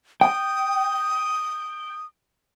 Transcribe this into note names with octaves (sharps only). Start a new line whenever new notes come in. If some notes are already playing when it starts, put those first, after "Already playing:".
G5 D#6